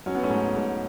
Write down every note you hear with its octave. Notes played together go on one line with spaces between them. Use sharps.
F#3 C#4
B3
A3 C#4
G#2
G#2